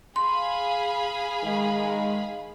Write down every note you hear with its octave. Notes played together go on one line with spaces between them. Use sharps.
G#4 F5 B5 C6
D#3 G#3